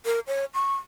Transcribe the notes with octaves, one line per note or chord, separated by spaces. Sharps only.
A#4
C#5
C#6